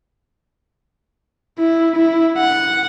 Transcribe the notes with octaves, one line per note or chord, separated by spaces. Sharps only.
E4
E4
F#5